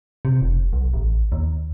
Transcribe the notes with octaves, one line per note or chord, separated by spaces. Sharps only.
C3
F1
B1
A1
D#2